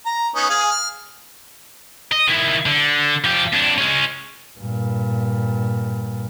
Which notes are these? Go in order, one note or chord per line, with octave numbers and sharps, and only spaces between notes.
A#5
B3 C#4 D#4
G#4 F5 G#5
F6
D#5
D#3 E4
D3
F3 G4
F2 D4
G#3 C#4
G2 A#2